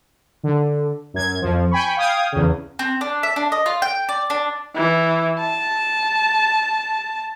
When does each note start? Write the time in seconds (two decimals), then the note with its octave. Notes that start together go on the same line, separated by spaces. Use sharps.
0.43 D3
1.14 F#2 G#6
1.42 F2 F3
1.71 G5 G#5 B5 C#6
1.97 F5 G5 D#6 G#6
2.32 E2 C#3
2.79 C4
3.01 D4
3.23 E5
3.36 D4
3.52 D#5
3.66 F4
3.82 G5
4.09 D5
4.30 D4
4.75 E3
5.40 A5